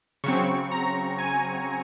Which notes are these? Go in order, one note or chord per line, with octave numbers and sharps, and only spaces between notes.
C#3 F#3 C4 C#6
A#5
G#5